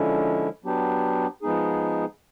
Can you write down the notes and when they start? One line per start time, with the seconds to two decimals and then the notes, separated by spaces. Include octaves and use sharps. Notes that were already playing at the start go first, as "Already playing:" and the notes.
Already playing: D3 F3 G#3 C#4 E4
0.64 F#3 B3 D4 G4
1.42 F3 G#3 B3 D#4 G#4